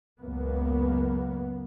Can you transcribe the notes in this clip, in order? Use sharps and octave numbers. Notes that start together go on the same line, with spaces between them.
C#2 F#2 A#3 B3